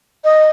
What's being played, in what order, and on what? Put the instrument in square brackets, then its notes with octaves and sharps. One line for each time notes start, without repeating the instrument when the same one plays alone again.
[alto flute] D#5